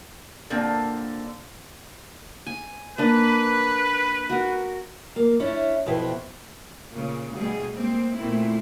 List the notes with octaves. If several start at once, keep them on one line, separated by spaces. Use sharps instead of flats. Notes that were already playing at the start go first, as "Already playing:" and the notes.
A#2 D3 A#3 C4
G#5
A#3 D4 B4
F#4 A#4
A#3
C#4 D4 E4
F2 B2 C4 E4 B4 C5
A#2 C#3
D2 B2 G3 G#4
G#3 A#3 C4
A#2 A3 C4 E4